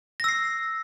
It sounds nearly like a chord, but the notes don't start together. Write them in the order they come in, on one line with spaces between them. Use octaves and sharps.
A#6 E6 C7